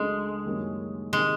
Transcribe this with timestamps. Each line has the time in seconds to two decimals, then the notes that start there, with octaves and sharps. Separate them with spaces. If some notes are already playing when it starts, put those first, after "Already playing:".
Already playing: C#2 C#3 F#3 G#3 A3 D4
0.46 F#2 D#3 G3 A#3 C#4
1.13 C3 D#3 G#3